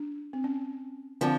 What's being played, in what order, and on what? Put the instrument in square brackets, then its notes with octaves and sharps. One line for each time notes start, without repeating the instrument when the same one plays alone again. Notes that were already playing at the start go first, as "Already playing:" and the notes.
Already playing: [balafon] D4
C4
C#4
[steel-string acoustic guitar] D3 F3 [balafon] C4